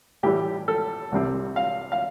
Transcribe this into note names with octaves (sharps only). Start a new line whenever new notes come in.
A2 E3 G3 G4
A4
C2 C3 G3 C4
F5
F5